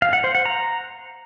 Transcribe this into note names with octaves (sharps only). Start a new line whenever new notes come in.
F5
F#5
C5
F#5
A#5